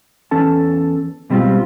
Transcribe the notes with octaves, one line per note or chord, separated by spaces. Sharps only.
E2 C#4 A4 A5
G#2 B2 G3 C4 F4 G4